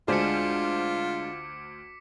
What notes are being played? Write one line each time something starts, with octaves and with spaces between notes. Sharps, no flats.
D2 G#3 D4 F4 C5 D6 B6 C#7